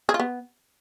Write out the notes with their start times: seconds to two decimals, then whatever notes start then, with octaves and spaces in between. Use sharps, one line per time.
0.09 G#4
0.14 F4
0.20 B3